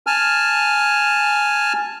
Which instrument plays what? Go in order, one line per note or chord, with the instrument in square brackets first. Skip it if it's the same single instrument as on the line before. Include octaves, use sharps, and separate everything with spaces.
[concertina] G#5 A5 F6